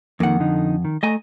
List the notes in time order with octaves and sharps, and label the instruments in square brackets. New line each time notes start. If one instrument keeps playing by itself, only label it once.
[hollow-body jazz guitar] F2 F#5 [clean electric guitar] D#3 A#3
[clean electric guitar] D3 D#4
D#3
[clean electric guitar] A3 [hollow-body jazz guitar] D#5 G#5 A#5